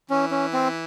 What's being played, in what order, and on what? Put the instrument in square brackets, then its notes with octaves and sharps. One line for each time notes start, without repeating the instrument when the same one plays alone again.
[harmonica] E3 [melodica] C#4
[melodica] C#4
C4